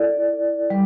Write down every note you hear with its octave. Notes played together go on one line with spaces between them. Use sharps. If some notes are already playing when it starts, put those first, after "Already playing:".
Already playing: E4 A4 D5
G3